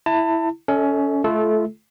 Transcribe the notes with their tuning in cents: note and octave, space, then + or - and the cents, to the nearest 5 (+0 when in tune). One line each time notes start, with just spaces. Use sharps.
E4 +0 A5 +30
C#4 +20 A4 +0 D#5 +45
A3 -30 F4 -30 A4 -20